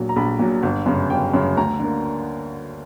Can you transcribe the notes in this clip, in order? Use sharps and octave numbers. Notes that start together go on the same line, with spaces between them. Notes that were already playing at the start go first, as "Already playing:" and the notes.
Already playing: A#1 A#2 F#3
A#5
A#1 B5
A#2 F#3
G1
F#2 C#3
G1 G5
F#2 C#3
D2 A#5
D3 A#3